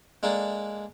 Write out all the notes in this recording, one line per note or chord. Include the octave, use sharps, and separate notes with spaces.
G#3 A#3 D4 G#4 A4